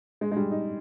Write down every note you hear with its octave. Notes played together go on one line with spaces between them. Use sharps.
G#3
G#3
G3
D#4